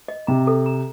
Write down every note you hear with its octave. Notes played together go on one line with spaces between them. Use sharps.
D#5
C3 A#5
A4
A#5